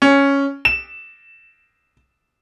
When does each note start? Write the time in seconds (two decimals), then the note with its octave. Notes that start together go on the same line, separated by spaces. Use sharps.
0.02 C#4
0.65 E7